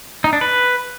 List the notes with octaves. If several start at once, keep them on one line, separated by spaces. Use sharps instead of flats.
D#4
D4
B4